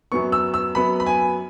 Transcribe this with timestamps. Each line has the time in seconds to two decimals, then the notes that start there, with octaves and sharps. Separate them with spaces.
0.12 F#2 F#3 B3 C#6
0.32 E6
0.54 E6
0.75 F#2 F#3 B3 B5
1.00 B5
1.06 G#5